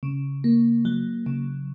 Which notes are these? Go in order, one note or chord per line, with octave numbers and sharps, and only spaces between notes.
C#3
A#3
F#3
C#3